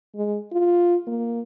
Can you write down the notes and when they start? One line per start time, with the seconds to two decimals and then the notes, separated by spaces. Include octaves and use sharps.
0.15 G#3
0.52 F4
1.07 A#3